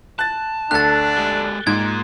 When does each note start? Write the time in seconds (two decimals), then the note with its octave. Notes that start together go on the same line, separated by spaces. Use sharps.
0.19 A5 F#6 A6
0.71 D2 D4 A4 F#6 A6
1.17 G#3 G4
1.67 G#2 A#3 F4 G#6